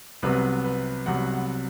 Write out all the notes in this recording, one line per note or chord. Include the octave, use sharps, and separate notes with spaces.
C2 C3 F#3 B3 B4
B4
C2 C3 F#3 B3 F#5
F#5